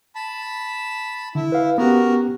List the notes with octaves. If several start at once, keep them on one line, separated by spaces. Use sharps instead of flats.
A5 B5
D3 E4
B4 F5
B3 C#4 F#4 G4 A#4